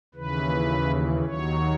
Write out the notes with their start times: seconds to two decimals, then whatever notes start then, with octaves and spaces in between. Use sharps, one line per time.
0.14 D#2 C#3 E3 B4
1.25 D#2 D#3 F#3 C#5